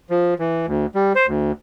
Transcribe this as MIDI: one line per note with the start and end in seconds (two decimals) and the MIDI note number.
0.10 0.34 53
0.39 0.66 52
0.67 0.86 38
0.95 1.13 55
1.15 1.27 72
1.27 1.52 38